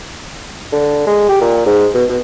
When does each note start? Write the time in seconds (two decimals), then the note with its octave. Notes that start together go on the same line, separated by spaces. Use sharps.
0.72 D3
1.07 G#3
1.29 G4
1.41 A#2
1.66 G#2
1.95 B2
2.09 B2